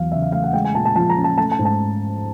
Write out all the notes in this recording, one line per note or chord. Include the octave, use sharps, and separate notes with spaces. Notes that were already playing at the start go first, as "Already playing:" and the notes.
Already playing: E2 F#3 F5
C#3 E5
F5
A3 F5
F#5
G#3 G5
G#5
A#2 A5
A5
F3 A5
A#5
C#4
A5
A3 A5
A5
G#2
A5